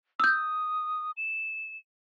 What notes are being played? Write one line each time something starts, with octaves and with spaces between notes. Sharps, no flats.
D#6 E6 G6
E7